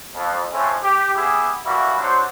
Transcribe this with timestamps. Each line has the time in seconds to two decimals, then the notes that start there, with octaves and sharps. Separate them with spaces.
0.15 F2
0.52 F2 A2 C4 C#4 E4
0.83 G4
1.15 B3 E4 G4 G#4
1.65 E3 G3 A#3 E4 F#4
1.99 F#3 D4 C5